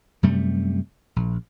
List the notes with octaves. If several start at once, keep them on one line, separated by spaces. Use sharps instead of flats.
F#2 C3 G3 A3
A#1